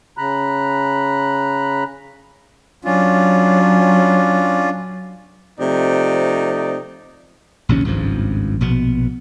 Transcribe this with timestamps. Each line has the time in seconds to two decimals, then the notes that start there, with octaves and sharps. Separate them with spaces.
0.17 C#3 A#5 B5 F#6
2.85 F#3 C#4 D4 F4
5.60 C3 F3 A3 D#4 D5
7.69 A#1 D#2 C3 C#4
7.85 G#1 C#2 G2 F3
8.61 A#1 B2 B3